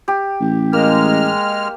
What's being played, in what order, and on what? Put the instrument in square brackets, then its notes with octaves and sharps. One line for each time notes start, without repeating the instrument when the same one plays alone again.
[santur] G4
[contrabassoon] A1
[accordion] G#3 F6 [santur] A#3